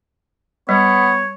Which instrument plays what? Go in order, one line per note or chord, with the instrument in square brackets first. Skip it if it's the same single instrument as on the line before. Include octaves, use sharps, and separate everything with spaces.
[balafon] G3 [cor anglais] B3 [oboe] C#5